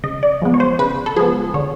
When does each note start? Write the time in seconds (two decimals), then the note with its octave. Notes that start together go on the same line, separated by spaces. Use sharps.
0.04 C#3 D#5
0.23 D5
0.42 F3 G#3 B3
0.54 C#5
0.60 C5
0.79 C#3 B4
1.06 A4
1.16 F3 G#3 B3 G#4
1.54 D3 C#5